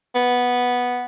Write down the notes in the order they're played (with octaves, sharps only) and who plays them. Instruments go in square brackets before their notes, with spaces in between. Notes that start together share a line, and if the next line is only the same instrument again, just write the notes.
[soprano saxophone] B3